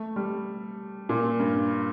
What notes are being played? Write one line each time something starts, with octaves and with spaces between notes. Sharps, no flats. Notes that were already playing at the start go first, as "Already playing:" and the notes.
Already playing: A3
G3
A#2
G2